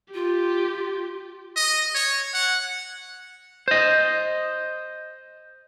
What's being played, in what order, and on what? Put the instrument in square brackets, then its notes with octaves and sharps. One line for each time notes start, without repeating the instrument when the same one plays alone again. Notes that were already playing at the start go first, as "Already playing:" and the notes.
[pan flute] F4 [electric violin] G4
[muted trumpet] D#5
C#5
F#5
[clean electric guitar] C5 D#5